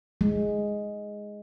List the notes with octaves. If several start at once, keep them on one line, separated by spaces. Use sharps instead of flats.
G#3